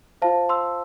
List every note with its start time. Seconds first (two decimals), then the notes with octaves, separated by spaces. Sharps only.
0.22 F4 C5 F5 A5
0.49 C6 E6